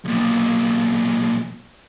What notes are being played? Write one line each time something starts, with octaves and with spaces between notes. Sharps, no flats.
B1 A#2